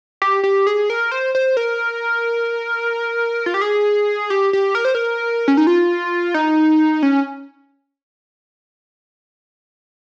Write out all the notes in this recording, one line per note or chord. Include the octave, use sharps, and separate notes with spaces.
G4
G4
G#4
A#4
C5
C5
A#4
F4
G4
G#4
G4
G4
A#4
C5
A#4
C#4
D#4
F4
D#4
C#4